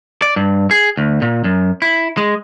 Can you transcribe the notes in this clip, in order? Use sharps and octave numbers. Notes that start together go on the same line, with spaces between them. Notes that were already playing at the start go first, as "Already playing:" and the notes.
D5
G2
G#4
D2
A#2
F#2
E4
G#3